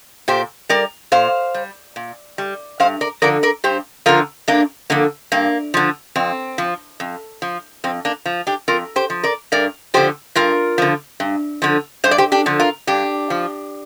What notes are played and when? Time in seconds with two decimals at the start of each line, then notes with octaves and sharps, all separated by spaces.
0.28 A#2 G4 C5
0.69 G3 A#4 D5
1.12 A#2 C5 F5
1.54 G3
1.96 A#2
2.38 G3
2.80 G2 C5 F5
3.01 A#4 D5
3.22 D3 F3 A#4 D5
3.43 A#4 D5
3.64 G2 G4 C5
4.06 D3 F3 F4 A#4
4.48 G2 A#3 D4
4.90 D3 F3 A#3
5.32 G2 A#3
5.74 D3 F3
6.16 F2 C4
6.58 F3
7.00 F2
7.42 F3
7.84 F2 C4
8.05 A#3 D4
8.26 F3
8.47 D4 G4
8.68 F2 F4 A#4
8.96 G4 C5
9.10 F3
9.23 A#4 D5
9.52 G2 A#4 D5
9.94 D3 F3 G4 C5
10.36 G2 F4 A#4
10.78 D3 F3
11.20 G2
11.62 D3 F3
12.04 G2 C5
12.11 D5
12.18 G4 C5
12.32 D4 G4
12.46 D3 F3
12.60 F4 A#4
12.87 G2 D4 G4
13.30 F3